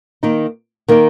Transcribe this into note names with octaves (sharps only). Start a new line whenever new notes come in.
D#3 A#3 D#4
D#3 A#3 D#4